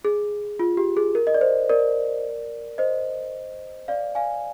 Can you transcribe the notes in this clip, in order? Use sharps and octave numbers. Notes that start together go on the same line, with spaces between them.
G#4
F4
G4
G#4
A#4
D#5
D5
C5
A#4 D5
C5 D#5
D5 F5
F5 G#5